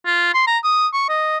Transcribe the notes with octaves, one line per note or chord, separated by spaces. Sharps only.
F4
C6
A#5
D#6
C#6
D#5